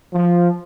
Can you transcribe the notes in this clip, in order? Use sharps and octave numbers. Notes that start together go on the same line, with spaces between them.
F3